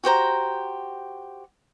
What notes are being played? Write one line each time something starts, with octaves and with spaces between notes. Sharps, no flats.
F#4 G4 C5 A#5